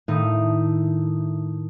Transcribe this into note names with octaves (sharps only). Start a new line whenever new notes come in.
A2 D#3 A3 D#4